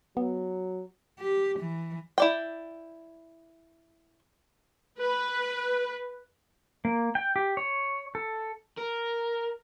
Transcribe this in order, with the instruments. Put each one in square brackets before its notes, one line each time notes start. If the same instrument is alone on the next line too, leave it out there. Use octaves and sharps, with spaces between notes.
[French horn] F#3 [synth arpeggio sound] B3
[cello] G4
E3
[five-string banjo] E4 D5 G5
[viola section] B4
[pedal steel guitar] A#3
G5
G4
C#5
A4
[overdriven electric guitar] A#4